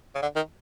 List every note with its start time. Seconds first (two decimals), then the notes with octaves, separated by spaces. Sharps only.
0.15 C#3
0.22 D3
0.36 D#3